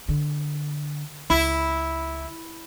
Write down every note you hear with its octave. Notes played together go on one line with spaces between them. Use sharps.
D3
C#2 E4